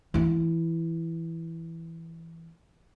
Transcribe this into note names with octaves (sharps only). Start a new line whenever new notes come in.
E3 E4